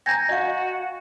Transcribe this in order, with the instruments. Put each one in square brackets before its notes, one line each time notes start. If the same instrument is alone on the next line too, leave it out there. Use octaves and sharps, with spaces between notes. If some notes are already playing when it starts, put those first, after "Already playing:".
[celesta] G5 G#5 A#5 [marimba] G6 G#6 A#6
[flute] F#4 [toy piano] D#5 F5